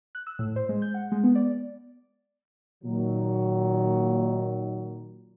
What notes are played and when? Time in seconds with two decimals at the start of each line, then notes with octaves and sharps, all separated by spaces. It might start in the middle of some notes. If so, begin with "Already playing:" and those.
0.15 F#6
0.27 E6
0.39 A2
0.56 C5
0.69 G#3
0.82 G6
0.94 F#5
1.12 G#3
1.24 B3
1.35 D5
2.84 A#2 D#3 F#3